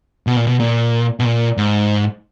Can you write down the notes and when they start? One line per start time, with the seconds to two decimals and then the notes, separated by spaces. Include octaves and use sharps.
0.27 B2
0.36 A#2
0.47 B2
0.60 A#2
1.20 B2
1.25 A#2
1.57 G#2